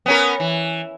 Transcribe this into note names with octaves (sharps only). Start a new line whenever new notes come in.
B3 C#4 A#4
E3